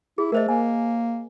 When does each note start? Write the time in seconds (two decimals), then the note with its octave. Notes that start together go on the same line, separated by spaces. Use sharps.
0.18 E4 G#4
0.32 A3 A#4 C5 D#5
0.48 A#3 G#5